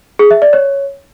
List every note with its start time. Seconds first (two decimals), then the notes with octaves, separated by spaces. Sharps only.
0.19 G#4
0.31 E5
0.42 D5
0.53 C#5